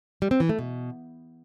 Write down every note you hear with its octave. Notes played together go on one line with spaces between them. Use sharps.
G3
C4
E3
A3
B2